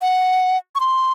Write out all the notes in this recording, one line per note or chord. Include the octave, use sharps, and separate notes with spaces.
F#5
C#6
C6